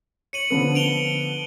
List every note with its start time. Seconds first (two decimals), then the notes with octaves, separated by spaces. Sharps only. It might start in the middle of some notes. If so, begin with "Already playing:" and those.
0.33 C#5 C#7 D#7 F#7
0.50 D3 F3 B3
0.75 D7 F7 G7